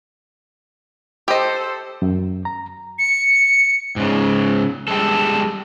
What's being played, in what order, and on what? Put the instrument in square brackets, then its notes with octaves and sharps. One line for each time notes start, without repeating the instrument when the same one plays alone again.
[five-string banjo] G4 D#5 [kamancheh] A4 C5
[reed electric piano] F#2
A#5
[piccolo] C#7
[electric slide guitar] G#2 C#3
G3 G#3 A4